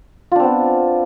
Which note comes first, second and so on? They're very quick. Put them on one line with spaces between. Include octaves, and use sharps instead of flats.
F4 D4 C4 B3